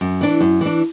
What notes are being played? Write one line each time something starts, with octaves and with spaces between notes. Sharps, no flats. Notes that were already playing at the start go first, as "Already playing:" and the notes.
F#2
E3 D4
F#2
E3 D4